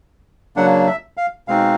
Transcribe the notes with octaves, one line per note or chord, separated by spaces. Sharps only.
C#3 F#3 A#3 D4 F#5
E5
F5
B2 G#3 C4 D#4 F5